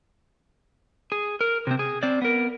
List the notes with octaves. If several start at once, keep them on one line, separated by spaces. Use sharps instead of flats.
G#4
A#4
C3 C4
G#4
C4 D5
B3 A#4